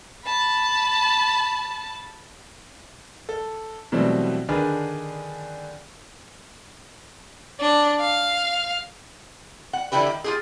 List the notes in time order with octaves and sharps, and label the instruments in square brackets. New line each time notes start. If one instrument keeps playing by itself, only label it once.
[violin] A5 B5
[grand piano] A4
B2 E3 F#3 G3 A3 C4
D3 D#3 D4 G#4 B4
[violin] D4
F5
[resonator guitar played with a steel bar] F#5
D3 E3 D4 E4 G4 B4
D#3
F4 G4 G#4